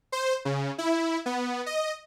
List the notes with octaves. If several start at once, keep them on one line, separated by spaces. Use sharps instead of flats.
C5
C#3
E4
B3
D#5